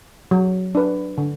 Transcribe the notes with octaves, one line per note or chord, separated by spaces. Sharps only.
F#3
D4 B4
D3